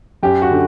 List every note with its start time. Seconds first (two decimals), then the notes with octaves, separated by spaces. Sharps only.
0.23 F#2 G4
0.42 F#4
0.51 D3